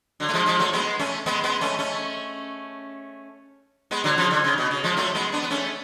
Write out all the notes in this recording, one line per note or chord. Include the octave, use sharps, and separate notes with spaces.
D3 F#3
A3
F3 G#3
F3 G#3
F#3 A3
G#3 B3
A3 C#4
G#3 B3
G#3 B3
A3 C#4
A3 C#4
G#3 B3
D3 F#3
C#3 F3
D3
C#3
B2
C#3
F3 G#3
F#3 A3
G#3 B3
B3 D4
B3
A3 C#4